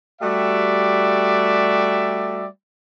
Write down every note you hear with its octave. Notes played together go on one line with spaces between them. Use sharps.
G3 A3 F#4 G4 D5 E5